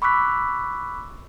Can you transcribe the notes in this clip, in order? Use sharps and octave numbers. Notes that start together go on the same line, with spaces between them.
B5 C#6 D6 E6 F#6 B6